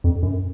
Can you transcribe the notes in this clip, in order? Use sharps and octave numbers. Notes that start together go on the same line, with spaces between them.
F2
F#2